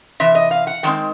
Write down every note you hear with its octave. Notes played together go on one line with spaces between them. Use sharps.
C3 E3 E5
D#5
F5
F#5
D#3 G#3 C4 G5